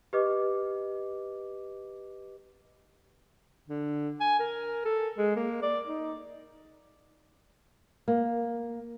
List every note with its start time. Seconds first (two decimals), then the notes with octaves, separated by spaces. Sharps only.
0.13 G4 B4 D#5 D6
3.69 D3
4.20 G#5
4.40 A#4
4.85 A4
5.18 G#3
5.36 A#3
5.62 D5
5.87 D#4
8.08 A#3